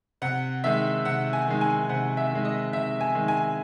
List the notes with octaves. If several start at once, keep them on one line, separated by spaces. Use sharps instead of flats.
C3 F#5
D#3 G#3 E5
C3 F#5
G#5
D#3 G#3
G#5
C3 F#5
E5
D#3 G#3
D#5
C3 E5
G#5
D#3 G#3
G#5